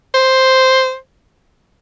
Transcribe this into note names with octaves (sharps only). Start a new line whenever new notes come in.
C5